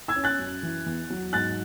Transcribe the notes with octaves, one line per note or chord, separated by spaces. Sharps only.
E6 G#6
C#4
F#6 A6
F#2
E3
E2
F#3
G#2 F#6 A6